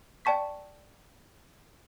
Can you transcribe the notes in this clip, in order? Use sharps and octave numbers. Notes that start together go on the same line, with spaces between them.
D5 G5 A5 C#6 B6